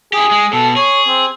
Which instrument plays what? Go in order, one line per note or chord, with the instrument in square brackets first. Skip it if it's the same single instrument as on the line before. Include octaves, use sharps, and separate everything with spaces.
[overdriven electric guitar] E4 G4 [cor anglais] G#4
[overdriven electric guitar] G#3
[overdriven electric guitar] B2 [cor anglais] A4
[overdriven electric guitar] G#4 [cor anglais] C#5
[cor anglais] C4